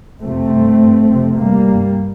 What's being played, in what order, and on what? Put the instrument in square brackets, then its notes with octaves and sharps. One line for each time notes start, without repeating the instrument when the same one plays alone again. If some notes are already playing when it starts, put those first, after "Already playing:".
[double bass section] F2 C3 A3 C4
G2
G2
F2 C3
G2 G3 A#3
G2